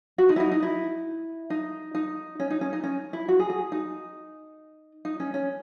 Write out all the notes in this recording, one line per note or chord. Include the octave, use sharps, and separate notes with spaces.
F#4
D#4
E4
D#4
D#4
E4
D#4
D#4
C#4
D#4
C#4
D#4
C#4
E4
F#4
G#4
G#4
D#4
D#4
C#4
C#4